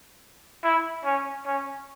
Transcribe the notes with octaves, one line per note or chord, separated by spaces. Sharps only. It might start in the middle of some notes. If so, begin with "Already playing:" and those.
E4
C#4
C#4